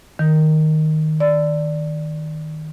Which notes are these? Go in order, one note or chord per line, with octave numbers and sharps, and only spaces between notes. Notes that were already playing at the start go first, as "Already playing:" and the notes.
D#3
D5